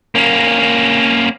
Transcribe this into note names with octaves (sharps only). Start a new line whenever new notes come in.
A#3 C#4